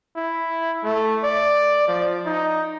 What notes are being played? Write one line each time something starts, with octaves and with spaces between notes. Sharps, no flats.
E4
A3
D5
F3
D#4